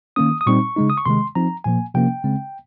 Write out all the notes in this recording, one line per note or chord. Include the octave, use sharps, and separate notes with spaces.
D#3 A#3 C#4 D#6
D#6
A#2 G3 C4 D#4 C#6
C#3 G#3 D#4
D#6
C#6
C3 D#3 G#3 C6
F3 C4 D#4 A#5
A#2 F3 A#3 G#5
C3 F3 A#3 C#4 G5
C#3 G#3 C4